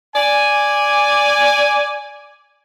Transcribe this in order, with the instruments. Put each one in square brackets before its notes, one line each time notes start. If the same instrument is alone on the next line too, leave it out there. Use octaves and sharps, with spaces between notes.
[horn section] D5 G#5